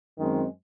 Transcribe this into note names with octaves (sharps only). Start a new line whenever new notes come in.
F#2 D#3 G#3 C4